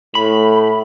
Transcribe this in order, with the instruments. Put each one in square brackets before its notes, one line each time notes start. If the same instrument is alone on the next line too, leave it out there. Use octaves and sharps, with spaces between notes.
[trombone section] A2 [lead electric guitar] B5